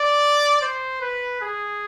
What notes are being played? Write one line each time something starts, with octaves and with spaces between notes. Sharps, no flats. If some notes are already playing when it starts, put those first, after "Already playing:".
Already playing: D5
C5
B4
G#4